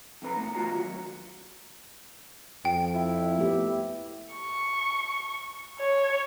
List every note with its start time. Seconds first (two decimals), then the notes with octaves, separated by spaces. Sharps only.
0.22 F2 C3 B4 A#5
0.36 B2 A3
0.55 E2 F4 F#4 A#5
0.75 D#2 F#3
2.65 F2 G5
2.94 E4
3.39 A3 B3 G4
4.35 C#6
5.79 C#5